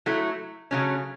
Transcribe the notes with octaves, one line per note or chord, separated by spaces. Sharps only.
F#3 A3 E4
C#3 F#3 A3 C#4